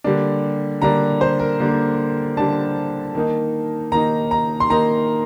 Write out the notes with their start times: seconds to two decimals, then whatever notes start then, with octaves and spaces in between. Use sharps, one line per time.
0.04 D3 G3 A#3 D4
0.82 D3 G3 A#3 D4 A#5
1.21 C5
1.39 A#4
1.60 D3 G3 A#3 D4
2.37 D3 G3 A#3 D4 A5
3.15 D#3 A#3 D#4
3.92 D#3 A#3 D#4 A#5
4.31 A#5
4.60 C6
4.70 D#3 A#3 D#4 A#5